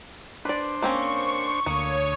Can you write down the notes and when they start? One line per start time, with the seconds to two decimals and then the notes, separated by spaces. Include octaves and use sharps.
0.45 D4 B4 C5 D5
0.82 A#3 C4 C#4 C#6
1.66 D2 A#3 C#5 D#6